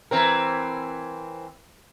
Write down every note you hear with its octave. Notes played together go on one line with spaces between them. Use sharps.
E3 C4 A#4